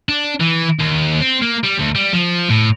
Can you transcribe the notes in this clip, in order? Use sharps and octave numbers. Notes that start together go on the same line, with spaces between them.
D4
E3
D#2
C4
A#3
G3
D2
G3
F3
A2